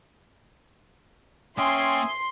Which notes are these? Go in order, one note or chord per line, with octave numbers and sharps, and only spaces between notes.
A#3 C#4 E5 G5 G#5 C6 D#6 C7